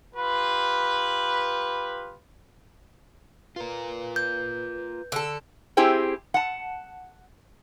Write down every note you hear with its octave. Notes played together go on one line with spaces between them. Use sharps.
F4 G4 B4
F4 A#4 B4
G6
D3 A4
C4 E4 G4 G#4 C5 G5
F#5 A5